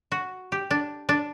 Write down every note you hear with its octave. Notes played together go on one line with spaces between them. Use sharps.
F#4
G4
D4
D4